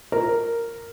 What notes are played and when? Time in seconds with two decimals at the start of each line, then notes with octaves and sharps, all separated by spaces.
0.12 A#4